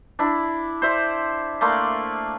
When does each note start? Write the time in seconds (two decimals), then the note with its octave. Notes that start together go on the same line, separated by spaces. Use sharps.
0.19 D4 E4
0.82 C5 D5 E5
1.61 A3 A#3 D5 C6